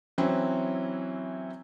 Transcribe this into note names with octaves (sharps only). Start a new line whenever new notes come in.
E3 F#3 C4 C#4 E4